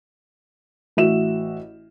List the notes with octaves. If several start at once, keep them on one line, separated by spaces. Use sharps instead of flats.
A1 F#4 E5 E7